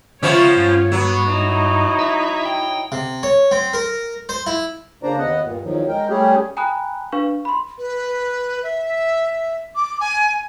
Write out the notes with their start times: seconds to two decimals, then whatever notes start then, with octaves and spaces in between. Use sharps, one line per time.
0.23 C#2 F3 B3 C#4 F4 C#5 E5
0.57 G2
0.92 F#3 B3
1.28 D#4 E4
1.99 E5
2.45 G5
2.92 C3
3.23 C#5
3.51 C4
3.73 A#4
4.29 C5
4.46 E4
5.03 C#3 A#3 D4 C5 D5 A#5
5.18 D#2 B3 D#5 F#5
5.44 G2 A#2
5.64 E2 D#3 F3 F#3
5.88 G#3 A#4 G5
6.10 G3 A3 C#4 G4 G#4
6.57 G5 G#5 A#5 B5 D#6 F#6
7.12 D4 B4 F5 C#6
7.45 B5 C6
7.78 B4
8.63 E5
9.76 D6
10.00 G#5